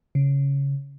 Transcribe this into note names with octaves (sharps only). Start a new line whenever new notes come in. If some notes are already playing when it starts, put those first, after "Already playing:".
C#3